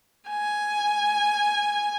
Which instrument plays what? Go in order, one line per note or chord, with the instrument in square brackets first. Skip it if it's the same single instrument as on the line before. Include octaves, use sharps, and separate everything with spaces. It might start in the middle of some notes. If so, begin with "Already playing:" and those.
[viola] G#5